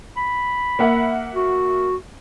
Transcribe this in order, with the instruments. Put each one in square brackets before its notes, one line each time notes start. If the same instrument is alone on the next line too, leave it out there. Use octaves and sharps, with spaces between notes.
[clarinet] B5
[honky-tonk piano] A#3 E5 F#5
[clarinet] F#4